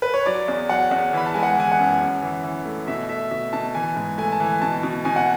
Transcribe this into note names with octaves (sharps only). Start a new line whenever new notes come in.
B4
C#5
F#3 D5
E2
F#3 F#5
E2
E3 B5
A5
G#3 G#5
F#5
E3 G#5
F#5
F#2
F#2
E3
E3
A3
B2 E5
A3 E5
B2 E5
B2 A5
E3 G#5
G#2
A3 G#5
A5
E3
G#5
B2 A5
B2
B2 G#5
F#5